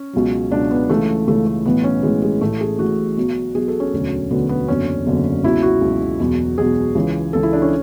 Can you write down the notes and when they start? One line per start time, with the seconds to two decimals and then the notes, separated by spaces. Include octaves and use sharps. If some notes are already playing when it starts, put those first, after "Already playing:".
Already playing: C#4
0.13 C#2 B2 F#3
0.52 C#2 B2 F#3 D4
0.71 B3
0.89 C#2 C#3 E3 A3
1.27 C#2 C#3 E3 A3
1.46 A3
1.66 B1 A2 E3 B3
1.84 C#4
2.03 B1 A2 E3 G#3
2.22 G#3
2.41 A1 A2 E3 A3
2.61 G#4
2.79 A1 A2 E3 F#4
3.17 B1 B2 F#3
3.55 B1 B2 F#3 G#4
3.68 A4
3.80 C#4
3.93 E1 D2 D3 F#3
4.30 E1 D2 D3 F#3 B3
4.49 B3
4.68 F#1 E2 D3 F#3 C#4
5.06 F#1 E2 D3 F#3
5.43 C#2 B2 F#3 E4
5.62 F#4
5.81 C#2 B2 F#3
6.20 E1 E2 B2 F#3
6.58 E1 E2 B2 F#3 G#4
6.95 C#2 C#3 E3
7.33 C#2 C#3 E3 A4
7.43 E4
7.53 D4
7.62 C#4